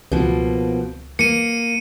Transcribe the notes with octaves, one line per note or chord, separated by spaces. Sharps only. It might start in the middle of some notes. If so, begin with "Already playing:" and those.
C#2 B2 F3 A#3
A#3 C#7 D#7